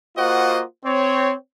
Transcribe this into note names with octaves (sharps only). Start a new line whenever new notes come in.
A#3 F4 F#4 C5 D#5 F#5
C4 C#5